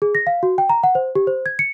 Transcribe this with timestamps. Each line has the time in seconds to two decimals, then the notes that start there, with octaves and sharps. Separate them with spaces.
0.02 G#4
0.15 A#6
0.27 F5
0.43 F#4
0.58 G5
0.69 A#5
0.83 F#5
0.95 C5
1.15 G4
1.27 C5
1.46 G#6
1.59 C#7